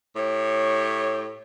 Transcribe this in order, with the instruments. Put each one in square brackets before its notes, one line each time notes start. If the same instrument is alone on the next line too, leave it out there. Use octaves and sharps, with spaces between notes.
[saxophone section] A2 G4 C#5